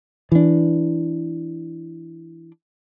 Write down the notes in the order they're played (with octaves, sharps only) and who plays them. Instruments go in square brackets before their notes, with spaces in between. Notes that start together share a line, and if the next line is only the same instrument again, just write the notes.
[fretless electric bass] E3 D4